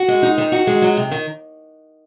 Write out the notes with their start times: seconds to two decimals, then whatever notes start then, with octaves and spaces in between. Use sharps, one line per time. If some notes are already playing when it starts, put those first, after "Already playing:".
Already playing: F#4
0.08 G#3
0.23 D#4
0.38 D#3
0.52 F#4
0.67 G#3
0.82 F#3
0.97 C3
1.11 D#3